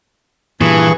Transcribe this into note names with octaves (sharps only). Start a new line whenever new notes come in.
G2 A#2 E3 G#4 C#6